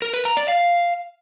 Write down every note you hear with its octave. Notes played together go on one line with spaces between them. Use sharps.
A#4
B4
A#5
D5
F5